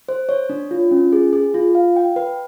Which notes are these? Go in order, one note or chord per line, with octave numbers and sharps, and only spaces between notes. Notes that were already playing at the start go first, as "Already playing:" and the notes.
C5
C#5
D4
F4
C#4
G#4
G#4
F4
F5
G5
B4